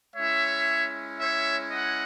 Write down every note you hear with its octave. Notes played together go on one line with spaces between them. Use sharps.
G#3 C#4 E4 C#5 E5
C#5 E5
D#5 F#5